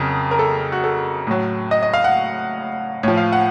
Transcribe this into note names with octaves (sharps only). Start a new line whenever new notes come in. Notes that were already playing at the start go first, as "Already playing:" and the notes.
Already playing: F2 C#3 F#3 A#4
A#4
A4
F#4
A4
A2 F#3
D#5
D#5
F5
F#5
A2 F3 C#5
F5
F#5